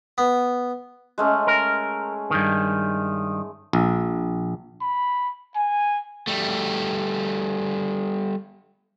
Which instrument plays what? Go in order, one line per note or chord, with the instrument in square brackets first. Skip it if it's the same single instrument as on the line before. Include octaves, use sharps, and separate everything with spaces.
[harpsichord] B3
[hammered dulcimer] G#3 A3 C#4
[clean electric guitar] A#4
G2 D#3
[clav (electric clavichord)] A#1
[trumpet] B5
G#5
[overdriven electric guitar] G3 A3